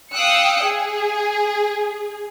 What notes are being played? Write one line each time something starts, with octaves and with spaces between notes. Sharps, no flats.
F5 G5 D#6 E6 F#6 C#7
G#4